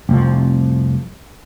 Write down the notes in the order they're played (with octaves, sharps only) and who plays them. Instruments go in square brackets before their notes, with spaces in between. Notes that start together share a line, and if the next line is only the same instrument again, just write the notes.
[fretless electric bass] F1 C2 F3